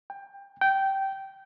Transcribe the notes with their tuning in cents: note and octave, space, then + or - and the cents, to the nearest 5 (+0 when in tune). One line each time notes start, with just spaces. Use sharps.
G5 +20
G5 -15